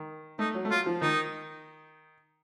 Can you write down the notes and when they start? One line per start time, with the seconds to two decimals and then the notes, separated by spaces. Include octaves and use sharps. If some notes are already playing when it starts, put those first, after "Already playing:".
Already playing: D#3
0.39 A3 D#4
0.55 F#3
0.65 A3
0.70 F#3 F4
0.86 F3
1.02 D#3 D#4